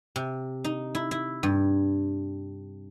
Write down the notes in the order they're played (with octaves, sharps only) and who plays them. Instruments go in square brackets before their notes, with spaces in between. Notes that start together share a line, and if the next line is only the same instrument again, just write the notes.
[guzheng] C3
D#4
E4
E4
G2